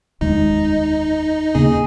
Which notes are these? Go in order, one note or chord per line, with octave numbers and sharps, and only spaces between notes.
F1 D#2 D#3 G#3 D#4
D#2 C#3 A#3 C#4 G#4